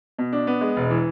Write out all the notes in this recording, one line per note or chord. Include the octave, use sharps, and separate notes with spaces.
B2
D4
B3
G#3
E1
E3